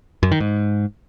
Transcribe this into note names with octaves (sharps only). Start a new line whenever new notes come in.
F#2
D#3
G#2